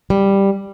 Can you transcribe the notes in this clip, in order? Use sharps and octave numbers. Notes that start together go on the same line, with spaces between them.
G3